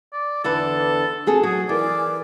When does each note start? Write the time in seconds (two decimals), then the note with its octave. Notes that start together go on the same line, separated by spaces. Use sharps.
0.12 D5
0.44 E2 D3 A4 B4
1.27 C4 F#4 G#4 A4
1.43 F#3 F#4 G#4
1.69 E3 A#4 D5